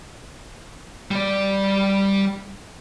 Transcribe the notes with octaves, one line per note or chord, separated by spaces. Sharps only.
G3 D5